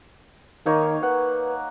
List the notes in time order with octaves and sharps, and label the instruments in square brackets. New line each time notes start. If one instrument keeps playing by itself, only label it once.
[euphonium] D#3 [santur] A#3 D#4 C#5
[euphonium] B4 [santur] F#5